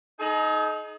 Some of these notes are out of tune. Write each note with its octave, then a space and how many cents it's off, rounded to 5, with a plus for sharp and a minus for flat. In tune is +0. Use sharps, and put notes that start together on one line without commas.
D#4 +5 G#4 +45